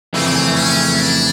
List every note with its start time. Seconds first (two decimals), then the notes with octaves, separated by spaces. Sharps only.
0.13 F2 C#3 E3 A3 C4
0.54 C#4
0.95 D4